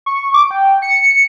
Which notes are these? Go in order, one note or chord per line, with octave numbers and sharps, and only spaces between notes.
C#6
D6
G5
C#7